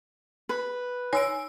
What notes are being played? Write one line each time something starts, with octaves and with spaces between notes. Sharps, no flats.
B4
D#4 C#5 G#5 E6 D7